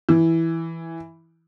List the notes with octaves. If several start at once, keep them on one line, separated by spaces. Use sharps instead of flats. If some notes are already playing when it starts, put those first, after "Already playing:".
E3